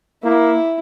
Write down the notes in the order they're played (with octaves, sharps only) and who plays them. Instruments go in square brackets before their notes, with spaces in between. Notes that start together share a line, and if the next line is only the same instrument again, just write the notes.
[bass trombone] A#3 [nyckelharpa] E4